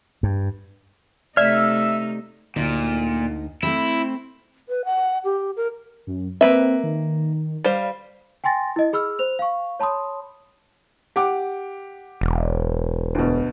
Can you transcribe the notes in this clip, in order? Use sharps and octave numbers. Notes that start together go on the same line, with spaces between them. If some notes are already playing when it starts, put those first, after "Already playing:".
G2
C3 A3 D#4 D5 E5 F6
D2 A#2 D#4
A3 C4 E4
B4
F#5
G4
A#4
F#2
A#3 C4 B4 E5
D#3
G3 C5 F5
G5 G#5 C6 A6 A#6
E4 D#5
G#4 B5 E6 F6
C5 F7
F5 C#6
C#5 A5 B5 C6 D#6
G4 F#5 D6
E1
D2 B2